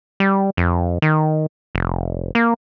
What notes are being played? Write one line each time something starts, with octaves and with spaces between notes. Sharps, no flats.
G3
F2
D#3
F1
A#3